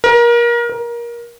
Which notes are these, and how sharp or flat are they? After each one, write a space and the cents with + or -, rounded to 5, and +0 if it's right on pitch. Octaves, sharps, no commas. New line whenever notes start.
A#4 +25
A#4 +20